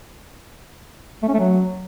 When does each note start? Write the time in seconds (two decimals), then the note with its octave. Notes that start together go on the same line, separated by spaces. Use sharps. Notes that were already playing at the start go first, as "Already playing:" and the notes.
1.23 A3
1.28 C#4
1.34 A3
1.39 F#3